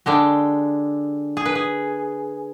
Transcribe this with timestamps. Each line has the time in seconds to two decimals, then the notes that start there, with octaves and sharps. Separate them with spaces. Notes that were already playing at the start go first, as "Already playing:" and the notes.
0.06 D3 G#3 G4
1.37 G#4
1.45 B4
1.55 G#4